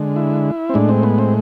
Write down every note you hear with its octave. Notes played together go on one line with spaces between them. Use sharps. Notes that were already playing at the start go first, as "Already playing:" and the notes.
Already playing: D3 G#3
E4
C4
A2 G#3 D4
C4
B3
C4